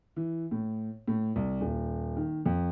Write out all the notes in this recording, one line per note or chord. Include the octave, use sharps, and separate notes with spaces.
E3
A2
A2
C2
D#1
D#3
F2